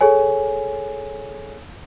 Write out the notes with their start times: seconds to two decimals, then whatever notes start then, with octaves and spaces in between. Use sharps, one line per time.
0.01 G#4 A4 C#5 G#5